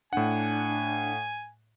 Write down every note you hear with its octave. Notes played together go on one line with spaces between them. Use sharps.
A2 D4 F#5 G#5